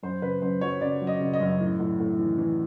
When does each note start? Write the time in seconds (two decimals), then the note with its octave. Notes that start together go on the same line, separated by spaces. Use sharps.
0.03 F#2 C5
0.22 C#3 B4
0.42 F#2 C5
0.61 F#3 C#5
0.81 C#3 D5
1.01 F#3
1.07 D#5
1.20 C#3
1.33 D#5
1.41 F#2
1.60 A2
1.79 A2
1.99 A2
2.19 E3
2.38 E3